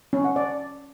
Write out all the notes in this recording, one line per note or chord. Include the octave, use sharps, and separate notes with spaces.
C#4
F#5
D5